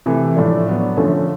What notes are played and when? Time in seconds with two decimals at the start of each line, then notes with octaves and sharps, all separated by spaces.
0.06 C3 E3 A3
0.36 A2 F3 A3 D4
0.67 F#3 B3 D4
0.97 F#2 D3 F3 A3 C#4